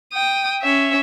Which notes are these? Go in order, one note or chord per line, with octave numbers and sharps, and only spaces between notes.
G5 D#6
C#4 E5